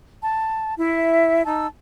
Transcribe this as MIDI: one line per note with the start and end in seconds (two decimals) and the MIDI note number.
0.22 0.75 81
0.78 1.41 64
0.78 1.41 76
1.46 1.66 63
1.46 1.66 81
1.46 1.66 88